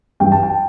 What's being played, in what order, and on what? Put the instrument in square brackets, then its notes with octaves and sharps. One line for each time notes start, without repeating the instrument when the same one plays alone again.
[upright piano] G2 E3 G5
A5
G5